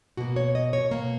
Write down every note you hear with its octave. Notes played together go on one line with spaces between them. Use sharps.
B2 A#3 F#4
C#5
D#5
C#5
B2 A#3